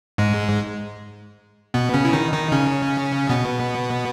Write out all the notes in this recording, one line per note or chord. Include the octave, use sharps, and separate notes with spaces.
G#2 G#3
B2 B3
C#3 C#4
E4
D#3 D#4
D#3 D#4
C#3 C#4
B2 B3